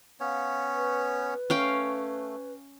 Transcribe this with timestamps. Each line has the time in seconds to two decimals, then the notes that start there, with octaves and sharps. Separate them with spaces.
0.20 B3 C#4 C#5 F5
0.75 B4
1.50 A3 C#4 F5 G5